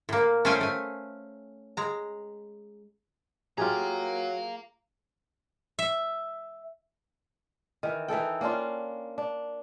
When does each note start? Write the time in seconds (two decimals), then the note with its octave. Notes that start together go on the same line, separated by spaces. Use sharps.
0.09 A2 A#3
0.45 A3 C#4 C5 F5 G5 G#5
0.61 A3 G#5
1.77 G#3 A#5
3.58 F#3 F4 G4 G#4 F5 A#5
5.79 E5
7.83 D#3 E3
8.08 E3 D#4 A4 G5
8.41 A#3 C#4 D4 F4
9.18 D4